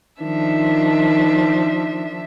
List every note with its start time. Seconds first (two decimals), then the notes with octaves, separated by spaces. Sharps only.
0.21 D#3 F3 D4 E5